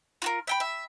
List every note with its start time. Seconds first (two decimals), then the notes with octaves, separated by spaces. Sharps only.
0.22 F4 F#4 A#4
0.47 E5 G5 B5
0.60 E5